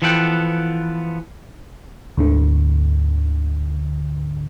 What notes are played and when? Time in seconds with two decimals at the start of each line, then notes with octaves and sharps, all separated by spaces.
0.02 E3 F3 B3 A4 F#5 G5
2.17 D2 G#2 D3